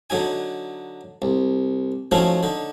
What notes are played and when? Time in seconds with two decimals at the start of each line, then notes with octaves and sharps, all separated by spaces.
0.10 D3 F#3 D#4 G#5
1.22 C2
2.11 F3 F#3 A3 C#4 D#4 E4
2.43 D3 D#4